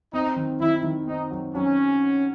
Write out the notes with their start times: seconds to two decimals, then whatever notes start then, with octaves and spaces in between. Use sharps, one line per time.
0.13 C4 D#4
0.36 D#3
0.60 D#3 E4
0.83 D#3
1.07 C4 D#4
1.31 F#3
1.55 F#3 C#4